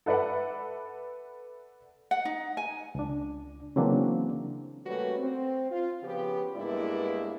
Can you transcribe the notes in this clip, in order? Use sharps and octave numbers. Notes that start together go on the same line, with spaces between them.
A4 B4 D5 E5 F#5
F#5
D#4
G#5
C#2 D4
C#3 E3 F#3 A#3 C4 D4
G3 A3 A#3 C#4 F#4 B4
C4
F4
C#3 F3 B3 G4
G2 G#3 A#3 B3 E4 D5